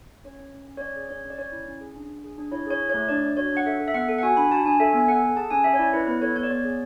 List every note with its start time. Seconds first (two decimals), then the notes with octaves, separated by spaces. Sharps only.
0.24 C#4 C#5
0.38 C#4
0.53 C#4
0.67 C#4
0.77 C#5
0.81 C#4 D5
0.96 G#4
1.09 C#4 C#5
1.24 C#4
1.30 D5
1.38 C#4 C#5
1.52 E4
1.66 C#4
1.81 G#4
1.96 D4
2.10 D4
2.24 G#4
2.38 D4
2.51 E4 C#5
2.66 G#4 C#5
2.81 E4
2.90 C#5
2.94 A3
3.09 D4 D5
3.23 D4
3.37 F#4 C#5
3.52 D4
3.57 F#5
3.66 A4 E5
3.80 A4
3.88 E5
3.94 B3 F#5
4.08 A4
4.18 F#5
4.23 F#4 G#5
4.37 D4 B5
4.51 F#4 A5
4.66 D4 G#5
4.80 A4 E5
4.93 B3 G#5
5.08 A4 F#5
5.23 A4
5.36 G#4 A5
5.50 C#4 G#5
5.64 C#4 E5
5.74 C#5
5.78 E4 D5
5.93 E4 B4
6.07 B3 B4
6.21 A4 C#5
6.36 B3 C#5
6.43 D5
6.50 B3 C#5
6.64 G#4